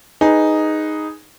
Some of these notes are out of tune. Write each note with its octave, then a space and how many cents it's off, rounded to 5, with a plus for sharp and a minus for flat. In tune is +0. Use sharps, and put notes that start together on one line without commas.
D#4 +0 G#4 +0 B4 +0